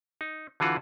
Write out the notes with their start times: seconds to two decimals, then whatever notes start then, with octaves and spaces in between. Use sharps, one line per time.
0.21 D#4
0.60 D3 E3 F4 F#4